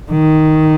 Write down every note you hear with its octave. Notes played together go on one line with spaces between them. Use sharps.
D#3